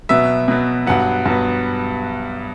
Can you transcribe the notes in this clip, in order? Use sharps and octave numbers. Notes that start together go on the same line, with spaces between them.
B2 F#3 B3 E5
B2 F#3 B3
G2 F#3 B3 F#5
G2 F#3 B3